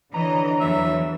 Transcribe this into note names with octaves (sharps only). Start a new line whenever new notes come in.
D3 E3 C#5 D#5 A#5
E2 E3 F#3 E5